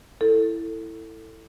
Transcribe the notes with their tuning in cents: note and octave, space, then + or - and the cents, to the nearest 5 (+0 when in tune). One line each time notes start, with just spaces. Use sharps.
E4 +0 A4 +20